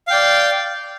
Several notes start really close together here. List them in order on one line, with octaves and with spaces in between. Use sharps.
F5 G5 D5